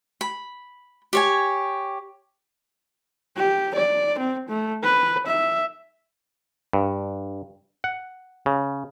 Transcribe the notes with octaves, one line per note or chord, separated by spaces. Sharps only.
B5
G4 C#5 G#5
G4
D5
C4
A3
B4
E5
G2
F#5
C#3